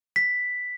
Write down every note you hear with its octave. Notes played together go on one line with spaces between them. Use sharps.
B6